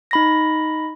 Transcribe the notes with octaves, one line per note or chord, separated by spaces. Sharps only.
D#4 B5 A#6